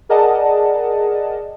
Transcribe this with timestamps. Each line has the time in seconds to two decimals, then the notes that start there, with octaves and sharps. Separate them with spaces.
0.09 G#4 A#4 D5 D#5 F#5 A5